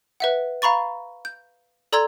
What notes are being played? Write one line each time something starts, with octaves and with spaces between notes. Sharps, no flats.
B4 E5 F#5
F5 A#5 B5 C#6 A6
G6
A4 D5 A#5 C6 E6 G#6